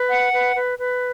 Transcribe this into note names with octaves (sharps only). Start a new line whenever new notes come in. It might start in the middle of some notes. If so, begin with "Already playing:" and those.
Already playing: B4
F#5
B4
B4
B4